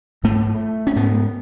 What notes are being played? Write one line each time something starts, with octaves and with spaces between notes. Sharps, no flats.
G#2 A3
C#4
G#2 B3